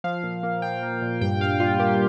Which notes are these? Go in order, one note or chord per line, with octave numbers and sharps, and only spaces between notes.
F3 F5
A#2
A#3
F3 G5
A#3
A#2
G2 G5
G2 F5
G3 F4
A#3 G4